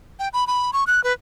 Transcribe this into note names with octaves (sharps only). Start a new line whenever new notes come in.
G5
B5
B5
C#6
F#6
B4